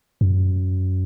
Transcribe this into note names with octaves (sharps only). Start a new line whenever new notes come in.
F#2